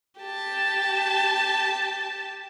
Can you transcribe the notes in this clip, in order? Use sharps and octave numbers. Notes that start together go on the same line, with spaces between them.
G4 A5